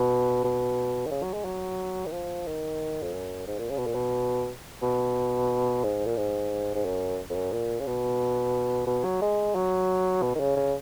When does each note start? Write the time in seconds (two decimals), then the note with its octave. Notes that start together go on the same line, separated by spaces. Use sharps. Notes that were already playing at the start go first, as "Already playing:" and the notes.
Already playing: B2
0.44 B2
1.06 D#3
1.11 C#3
1.22 F#3
1.33 G#3
1.45 F#3
2.06 D#3
2.12 F3
2.47 D#3
3.02 F2
3.13 F#2
3.47 G#2
3.59 A#2
3.70 C#3
3.77 B2
3.86 A#2
3.94 B2
4.82 B2
5.84 G#2
6.05 A#2
6.17 G#2
6.74 G#2
6.85 F#2
7.30 F2
7.35 F#2
7.52 A#2
7.80 C#3
7.86 B2
8.87 B2
9.04 F#3
9.22 G#3
9.55 F#3
10.22 B2
10.35 D#3
10.40 C#3
10.56 C#3